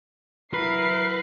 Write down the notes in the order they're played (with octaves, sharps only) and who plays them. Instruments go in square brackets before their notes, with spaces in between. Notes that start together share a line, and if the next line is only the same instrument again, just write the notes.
[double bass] F#3 E4 [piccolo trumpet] A#4 [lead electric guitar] B4 [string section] C7